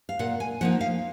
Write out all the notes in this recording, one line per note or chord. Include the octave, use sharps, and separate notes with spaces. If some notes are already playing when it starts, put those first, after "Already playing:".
F5
A#2 F#5
G#5
F3 A#3 D#4 F#5
F5